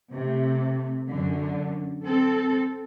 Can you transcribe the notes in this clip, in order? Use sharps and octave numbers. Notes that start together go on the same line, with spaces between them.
C3 A3
F#2 D3
C4 A4